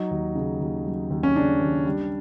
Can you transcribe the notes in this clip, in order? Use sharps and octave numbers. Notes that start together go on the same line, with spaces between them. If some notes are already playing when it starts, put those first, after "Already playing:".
Already playing: F#3 D#4
D#2
C#3
D#2
F#3
D#2
C#4
C#3 D4
D#2
G3